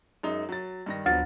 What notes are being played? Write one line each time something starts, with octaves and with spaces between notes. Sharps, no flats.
F#2 G#3 D#4
F#3 A6
G2 D#3 A#6
D2 F3 F#3 B3 A6